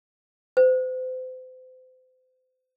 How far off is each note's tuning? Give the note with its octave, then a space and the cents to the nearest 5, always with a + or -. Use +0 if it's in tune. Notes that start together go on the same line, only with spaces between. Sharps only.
C5 -35